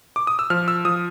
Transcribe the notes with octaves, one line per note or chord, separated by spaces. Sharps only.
D6
D#6
E6
F3 F6
E6
F3 D#6